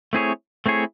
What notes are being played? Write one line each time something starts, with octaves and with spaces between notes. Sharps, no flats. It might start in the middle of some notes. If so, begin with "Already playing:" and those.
A3 C4 E4 G#4 C#5
A3 C4 E4 G#4 C#5